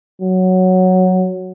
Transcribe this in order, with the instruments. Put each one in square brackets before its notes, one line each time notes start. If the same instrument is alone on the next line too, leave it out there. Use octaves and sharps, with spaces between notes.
[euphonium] F#3